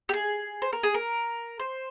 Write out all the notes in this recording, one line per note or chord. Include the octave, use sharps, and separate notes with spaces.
G4
G#4
C5
A#4
G#4
A#4
C5